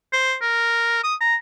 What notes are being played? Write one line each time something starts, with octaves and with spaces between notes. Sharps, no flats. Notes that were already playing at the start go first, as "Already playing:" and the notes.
C5
A#4
D#6
A#5